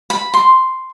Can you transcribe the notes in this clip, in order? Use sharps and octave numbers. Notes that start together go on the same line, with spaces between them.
B5
C6